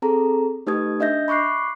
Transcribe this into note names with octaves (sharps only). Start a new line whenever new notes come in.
C4 G#4 A4 A#5
A3 D#4 G4 B4 D#6 G#6
D4 D#5 E5 G6 A#6
B5 C#6 D6 F#6 C7